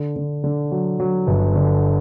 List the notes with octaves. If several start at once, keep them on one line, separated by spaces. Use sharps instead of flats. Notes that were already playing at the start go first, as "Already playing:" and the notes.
Already playing: D3
D3
D3
F#3
F#3
G1
D3